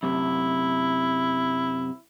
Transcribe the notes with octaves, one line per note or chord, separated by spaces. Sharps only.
F#2 C3 E4